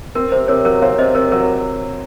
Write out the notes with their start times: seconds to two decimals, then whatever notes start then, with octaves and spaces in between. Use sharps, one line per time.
0.15 C4 A#4
0.32 C3 C5
0.48 C3 A#4 C#5
0.65 F#3 A#4 C#5
0.82 C4 C#5 F5
0.98 C3 C5 D#5
1.15 C3 A#4 C#5
1.32 F#3 A#4 C#5